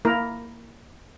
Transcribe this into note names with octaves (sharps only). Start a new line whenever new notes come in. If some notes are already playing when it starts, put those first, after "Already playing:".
A#3 E4 A#4